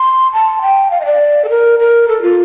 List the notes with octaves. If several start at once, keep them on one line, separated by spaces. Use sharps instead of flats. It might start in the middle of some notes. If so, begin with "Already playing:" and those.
Already playing: C6
A5
G5
F5
D#5
D5
A4
A#4
A#4
A4
F4